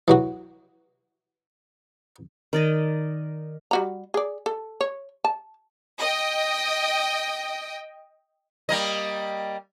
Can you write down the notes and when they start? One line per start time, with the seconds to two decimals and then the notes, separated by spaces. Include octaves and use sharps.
0.08 E3 F#3 F#4
2.53 D#3 D5 D#5
3.71 G3 F#4 A#5
4.14 G#4 D5
4.46 A4
4.81 C#5
5.24 A5
6.01 D#5 G5
8.69 G3 A#3 D#5